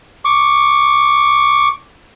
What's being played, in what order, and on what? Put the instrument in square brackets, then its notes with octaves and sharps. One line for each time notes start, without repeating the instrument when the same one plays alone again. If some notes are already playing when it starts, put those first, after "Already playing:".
[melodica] C#6 D6